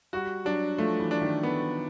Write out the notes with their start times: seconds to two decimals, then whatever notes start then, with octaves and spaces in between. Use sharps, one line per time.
0.13 G3 F#4
0.45 F#3 D4
0.78 F3 A3
1.00 E3
1.11 D4
1.21 D#3
1.43 B3